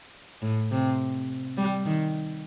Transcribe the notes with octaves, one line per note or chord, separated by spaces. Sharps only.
A2
C3
G3
D#3